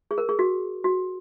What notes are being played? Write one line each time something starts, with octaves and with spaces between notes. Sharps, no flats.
G#4
A#4
G#4
F#4
F#4